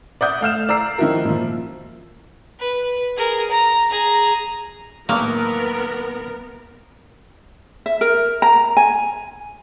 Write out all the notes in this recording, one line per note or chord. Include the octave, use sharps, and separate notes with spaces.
D5 E5 F#5 D#6 G6
A3 F5 F6 E7
D5 A#5 E6 C7
D#3 F3 D#4 E4 F#4 A#4
A#2 F3
B4
G#4 A#4
A#5
G#4 A#5
A2 D#3 F#3 A#3 B3 A#4
E5
A#4
A#5
G#5